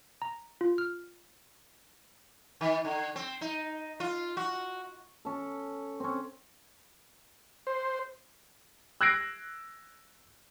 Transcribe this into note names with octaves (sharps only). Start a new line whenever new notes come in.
A#5
F4
F6
D#3
D3
C4
D#4
F4
F#4
C#4 A4
C4 C#4
C5
E6 F#6 G#6 A#6 C7 D7